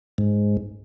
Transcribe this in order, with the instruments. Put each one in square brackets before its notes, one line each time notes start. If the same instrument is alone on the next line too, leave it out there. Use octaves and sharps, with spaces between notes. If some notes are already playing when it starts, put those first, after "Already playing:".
[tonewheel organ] G#2